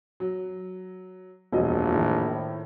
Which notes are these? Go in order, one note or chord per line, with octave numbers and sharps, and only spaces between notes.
F#3
E1 A#1 F#2 D#5
A2 D#3